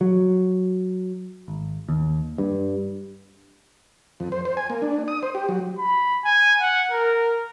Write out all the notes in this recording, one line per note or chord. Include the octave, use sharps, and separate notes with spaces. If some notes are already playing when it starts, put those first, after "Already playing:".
F#3
G#1
D#2
G2
F2
C5
C5
G#5
A#3
D4
D#6
C5
G4
F#3
B5
G#5
F#5
A#4